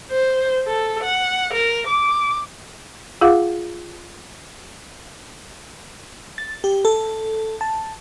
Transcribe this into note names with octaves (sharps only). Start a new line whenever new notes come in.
C5
A4
F#5
A#4
D6
F4 G#4 F5 F#5 D6
A6
G4
A4
A5